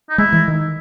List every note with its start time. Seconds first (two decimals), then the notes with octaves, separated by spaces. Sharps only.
0.10 D#4
0.18 G#3 E4
0.33 E3
0.48 D#3